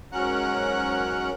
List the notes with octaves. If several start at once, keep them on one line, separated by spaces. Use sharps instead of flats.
G#2 F#3 C#4 A#4 F#5 F#6